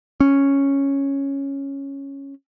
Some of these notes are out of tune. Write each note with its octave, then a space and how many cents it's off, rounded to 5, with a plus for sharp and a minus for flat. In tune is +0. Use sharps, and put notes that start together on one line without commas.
C#4 -5